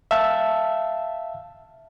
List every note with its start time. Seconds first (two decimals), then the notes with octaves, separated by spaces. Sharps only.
0.11 E5 F5 A5